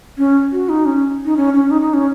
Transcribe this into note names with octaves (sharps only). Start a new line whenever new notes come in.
C#4
F#4
D#4
C#4
D#4
C#4
C#4
D#4
D#4
C#4